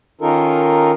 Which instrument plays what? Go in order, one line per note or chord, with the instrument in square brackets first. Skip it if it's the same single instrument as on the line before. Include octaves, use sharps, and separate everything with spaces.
[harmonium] D#3 C#4 D#4 F4 A4 A#4